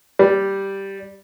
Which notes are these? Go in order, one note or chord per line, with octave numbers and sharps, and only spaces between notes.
G3